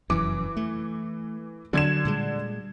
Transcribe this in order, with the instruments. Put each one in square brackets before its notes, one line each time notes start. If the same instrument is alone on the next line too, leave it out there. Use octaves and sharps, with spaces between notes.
[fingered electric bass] F1 F#2 [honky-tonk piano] E3 D6
[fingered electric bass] A3
[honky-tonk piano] D3 G#6 E7 [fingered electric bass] F#3
[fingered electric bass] A#2 G3 G#3